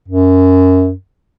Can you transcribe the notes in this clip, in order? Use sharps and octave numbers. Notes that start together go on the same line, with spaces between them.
F#2